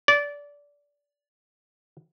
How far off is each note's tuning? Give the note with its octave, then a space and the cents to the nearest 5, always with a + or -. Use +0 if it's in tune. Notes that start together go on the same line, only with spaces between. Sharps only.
D5 -20